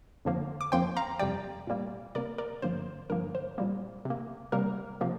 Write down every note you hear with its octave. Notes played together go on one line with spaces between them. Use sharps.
F2 D3 F3 A#3
D6
F2 F3 A#3 G5 C6
F5 A#5
F2 C3 G3 D5 G5
A#2 G3 A#3
C3 A#3 A#4 D5
A#4 D5
G2 D3 F3 A#3 C5
G2 D3 F3 A#3 A#4
C5
A#2 G3 A#3
C3 A#3
C3 G3 A#3 A#4
C3 F3 A#3